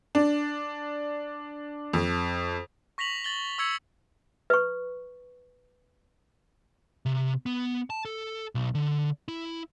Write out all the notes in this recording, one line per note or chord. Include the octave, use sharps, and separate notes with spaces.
D4
F2
C#6 A#6 B6 F7 F#7
A6 F#7 G7
C#6 E6 G#6 C#7
B4 C#6
C3
B3
A5
A4
B1
D3
E4